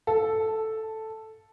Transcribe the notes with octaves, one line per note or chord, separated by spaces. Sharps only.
A4